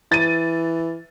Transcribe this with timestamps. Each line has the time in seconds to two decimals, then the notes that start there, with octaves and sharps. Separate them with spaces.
0.12 E3 A6 D#7